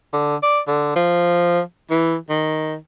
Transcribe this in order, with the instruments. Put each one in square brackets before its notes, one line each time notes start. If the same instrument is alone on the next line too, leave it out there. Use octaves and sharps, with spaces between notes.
[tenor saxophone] D3
D5
D3
F3
E3
D#3